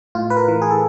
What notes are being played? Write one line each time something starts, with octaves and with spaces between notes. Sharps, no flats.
A2 F4
B4
A#4
E3
G#4
A4